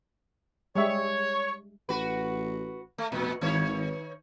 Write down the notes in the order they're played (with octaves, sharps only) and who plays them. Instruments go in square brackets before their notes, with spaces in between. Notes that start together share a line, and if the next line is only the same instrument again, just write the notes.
[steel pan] G3 G#3 E5 [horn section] C#5
[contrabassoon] A1 [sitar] F#4 B4
[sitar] A3
[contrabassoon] F1 [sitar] A#2
[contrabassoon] G#1 [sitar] D#3 C#5